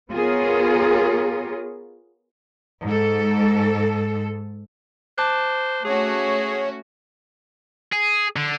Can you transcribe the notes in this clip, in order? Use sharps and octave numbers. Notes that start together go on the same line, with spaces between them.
B3 F4 G#4 A#4 C#5
G#2 A4
C5 A5 D6 F#6
A3 C#4 F#4 G#4 C#5
G#4
D3